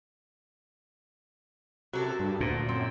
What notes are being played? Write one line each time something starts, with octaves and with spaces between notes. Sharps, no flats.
C3 F#3 F#4 A4 A#4
G2
D2 A#2
F#2 C4